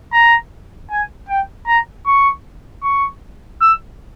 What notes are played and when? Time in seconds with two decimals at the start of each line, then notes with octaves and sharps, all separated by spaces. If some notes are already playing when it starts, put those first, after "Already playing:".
0.13 A#5
0.90 G#5
1.29 G5
1.67 A#5
2.06 C#6
2.83 C#6
3.61 E6